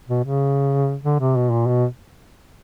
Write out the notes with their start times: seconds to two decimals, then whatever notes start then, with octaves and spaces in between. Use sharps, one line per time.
0.08 B2
0.24 C#3
1.04 D3
1.20 C3
1.36 B2
1.52 A#2
1.67 B2